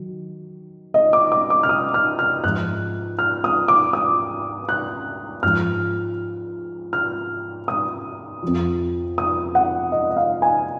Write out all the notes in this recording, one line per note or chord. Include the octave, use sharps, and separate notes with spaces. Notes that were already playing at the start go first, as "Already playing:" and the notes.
Already playing: D#3 F#3
D#5
D6
D6
D6
F6
D#6
F6
F6
G#2 F3 F#6
F6
D#6
D6
D#6
F#6
G#2 F3 F6
F6
D#6
F2 F3
D#6
F#5
D#5
D#5
F5
G#5